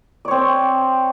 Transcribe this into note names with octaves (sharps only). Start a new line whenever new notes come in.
C4 C#5 D5